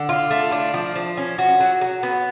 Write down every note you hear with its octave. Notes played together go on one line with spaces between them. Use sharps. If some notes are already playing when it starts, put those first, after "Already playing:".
Already playing: D3
F4
A3
D4
F3
F3
C#4
F#4
F#3
F#3
B3